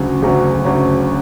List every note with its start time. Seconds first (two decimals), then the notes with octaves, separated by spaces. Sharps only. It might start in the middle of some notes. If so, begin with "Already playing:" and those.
Already playing: D2 C#3 F#3 C#4
0.22 D2 C#3 F#3 C#4
0.65 D2 C#3 F#3 C#4